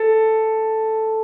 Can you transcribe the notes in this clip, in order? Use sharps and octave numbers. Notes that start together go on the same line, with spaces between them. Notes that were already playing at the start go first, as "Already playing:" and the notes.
Already playing: A4